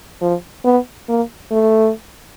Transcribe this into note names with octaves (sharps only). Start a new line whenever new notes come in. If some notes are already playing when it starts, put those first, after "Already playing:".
F3
B3
A#3
A3